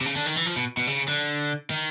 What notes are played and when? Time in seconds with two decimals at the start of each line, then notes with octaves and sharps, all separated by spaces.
0.01 C3
0.06 C#3
0.16 D3
0.26 D#3
0.36 E3
0.46 F3
0.56 B2
0.77 B2
0.87 C#3
1.08 D3
1.71 D#3